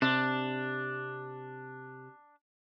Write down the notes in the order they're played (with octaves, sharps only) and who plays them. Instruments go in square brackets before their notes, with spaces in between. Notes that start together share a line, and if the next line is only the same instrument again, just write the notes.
[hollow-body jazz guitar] C3 [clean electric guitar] D4